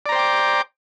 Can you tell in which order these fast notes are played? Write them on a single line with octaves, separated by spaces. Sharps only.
D5 A#5 C5 G5 D6